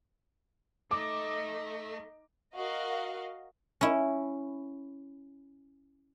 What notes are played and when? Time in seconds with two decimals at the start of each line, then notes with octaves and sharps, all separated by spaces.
0.91 A3 D#4 D#5 D6
2.55 F#4 A#4 D#5 F5
3.81 C#4 E4